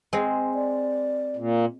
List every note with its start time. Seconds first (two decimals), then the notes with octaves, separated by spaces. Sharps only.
0.13 G#3 C4
0.54 D5
1.37 A#2